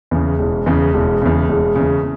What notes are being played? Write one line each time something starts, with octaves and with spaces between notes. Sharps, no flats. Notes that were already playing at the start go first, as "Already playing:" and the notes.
E2 C#3
E1
E2 C#3
E1
E2 C#3
E1
E2 C#3